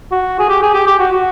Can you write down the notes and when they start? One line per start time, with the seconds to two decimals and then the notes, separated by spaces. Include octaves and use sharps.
0.12 F#4
0.39 G#4
0.49 G4
0.62 G#4
0.74 G4
0.87 G4
0.99 F#4
1.12 F#4